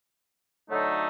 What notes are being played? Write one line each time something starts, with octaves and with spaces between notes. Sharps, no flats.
D3 F#3 A3 D#4